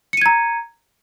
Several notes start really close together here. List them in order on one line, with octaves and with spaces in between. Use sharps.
C#7 D#7 G#6 A#5